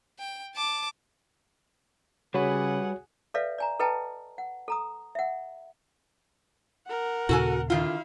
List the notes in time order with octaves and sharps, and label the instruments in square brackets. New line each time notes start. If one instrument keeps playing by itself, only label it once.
[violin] G5
A5 D6
[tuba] C#3 [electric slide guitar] G3 B4 [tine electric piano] F#4 C#5 [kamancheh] G#4 F#5
[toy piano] A4 B4 D5 E5 F5
D5 G#5 A#5
A4 B4 D#5 G5 A5 A#5
F#5
A4 A#5 D#6
E5 F#5
[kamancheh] A#4 F#5
[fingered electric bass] D#2 A#2 C#3 [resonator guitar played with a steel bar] F#4 A4 G#5
[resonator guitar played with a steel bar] D3 D#3 F4 [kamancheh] E4 F5